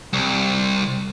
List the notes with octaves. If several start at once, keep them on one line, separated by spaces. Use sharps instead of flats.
C2